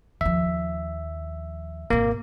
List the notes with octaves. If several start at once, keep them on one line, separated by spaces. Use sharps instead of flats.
D#2 F3 E5
G#1 C3 A#3